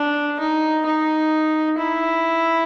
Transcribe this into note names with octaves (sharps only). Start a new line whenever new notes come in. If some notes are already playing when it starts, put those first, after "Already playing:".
Already playing: D4
D#4
D#4
E4